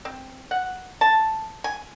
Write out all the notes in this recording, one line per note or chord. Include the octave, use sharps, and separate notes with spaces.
C4
F#5
A5
G#5